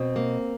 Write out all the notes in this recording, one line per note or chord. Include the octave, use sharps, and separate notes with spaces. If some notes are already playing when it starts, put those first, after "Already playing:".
Already playing: B2 C4
A#3